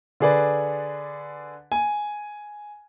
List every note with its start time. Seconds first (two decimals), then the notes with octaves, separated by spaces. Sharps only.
0.20 D3 D4 G#4 B4 D5
1.72 G#5